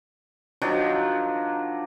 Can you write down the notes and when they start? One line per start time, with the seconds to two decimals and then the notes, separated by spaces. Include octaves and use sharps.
0.62 D#3 F3 F#3 D4